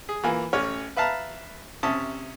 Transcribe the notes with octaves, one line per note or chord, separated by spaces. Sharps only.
G#4
E3 A#3 F4 G#5
A1 C#4 C#5 F6
B4 E5 F5 A5 A#5
C3 C#4 E5 A5 D#6